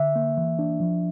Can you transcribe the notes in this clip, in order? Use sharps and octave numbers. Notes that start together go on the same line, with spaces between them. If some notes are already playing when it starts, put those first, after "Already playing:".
Already playing: D3 E5
A#3
E3
D4
F3